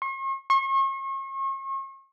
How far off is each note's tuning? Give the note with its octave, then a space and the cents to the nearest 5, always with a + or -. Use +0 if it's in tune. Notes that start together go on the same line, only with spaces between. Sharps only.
C#6 -45
C#6 -40